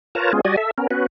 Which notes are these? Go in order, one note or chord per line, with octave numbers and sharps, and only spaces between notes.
F4 A#4 B4 C#5 A5 A#5
G#3 B3 C#4 F4 G#4
G3 F#4 D5 D#5 G#5
A4 E5
B3 C#4 A#4
B3 C#4 F#4 B4